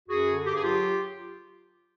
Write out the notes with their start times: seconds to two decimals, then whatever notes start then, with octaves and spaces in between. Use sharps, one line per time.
0.09 F#2 F#4 G#4
0.27 D3
0.45 G2 G4
0.54 G#4
0.63 F#3 F4 G4